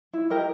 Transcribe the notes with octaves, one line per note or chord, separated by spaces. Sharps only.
E4
G4 A#4 D#5